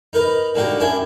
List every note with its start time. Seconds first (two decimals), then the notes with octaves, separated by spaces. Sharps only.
0.13 D#4 A#4 B4
0.55 D3 D#3 A#3 F#4 G4
0.80 F#2 D4 E4 G5 G#5